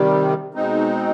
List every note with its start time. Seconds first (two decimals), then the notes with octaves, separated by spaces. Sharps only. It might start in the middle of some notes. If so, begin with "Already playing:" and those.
Already playing: C3 D#3 G3
0.54 B2 G#3 C4 D#4